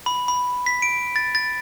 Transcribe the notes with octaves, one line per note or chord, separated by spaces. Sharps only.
B5
B5
B6
D7
A6
A6